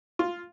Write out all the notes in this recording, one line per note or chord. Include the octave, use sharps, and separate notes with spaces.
F4